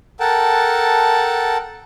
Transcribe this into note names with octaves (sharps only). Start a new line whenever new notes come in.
A4 A#4 F#5 G5 A5